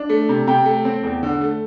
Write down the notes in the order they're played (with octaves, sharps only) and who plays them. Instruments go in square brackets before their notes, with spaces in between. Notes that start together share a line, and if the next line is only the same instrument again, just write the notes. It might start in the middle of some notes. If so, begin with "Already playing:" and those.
Already playing: [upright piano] D4
A3
C3
C3 G5
A3
C4
E2
D3
A3